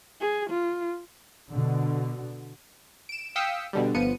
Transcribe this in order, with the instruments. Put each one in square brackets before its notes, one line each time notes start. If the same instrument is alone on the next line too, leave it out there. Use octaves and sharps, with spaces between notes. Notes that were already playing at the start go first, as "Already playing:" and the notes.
[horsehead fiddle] G#4
F4
[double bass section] B2 D3
[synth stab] D7 E7
F5 G5 D#6 E6 B6 C#7
B2 D3 G3
G1 F3 B3 C#7 D#7